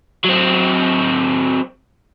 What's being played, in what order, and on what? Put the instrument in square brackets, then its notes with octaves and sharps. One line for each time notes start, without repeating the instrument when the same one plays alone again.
[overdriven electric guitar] F#3 C4